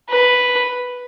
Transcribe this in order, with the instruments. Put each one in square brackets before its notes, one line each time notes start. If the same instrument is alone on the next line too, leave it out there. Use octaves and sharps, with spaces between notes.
[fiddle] B4